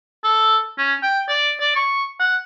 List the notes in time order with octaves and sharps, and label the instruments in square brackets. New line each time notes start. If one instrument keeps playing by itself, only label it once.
[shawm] A4
C#4
G5
D5
D5
C#6
F#5